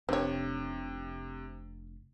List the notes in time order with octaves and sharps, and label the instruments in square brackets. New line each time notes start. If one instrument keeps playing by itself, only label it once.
[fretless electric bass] F1 D4 [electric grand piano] C3 [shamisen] C4 C#5